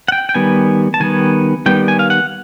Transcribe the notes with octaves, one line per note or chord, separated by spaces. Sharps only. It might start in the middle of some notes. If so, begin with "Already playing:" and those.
F#5
G5
G5
D#3 G3 B3 G#5
A5
D#3 G3 B3 G#5
D#3 G3 B3 G5
G#5
F5
F#5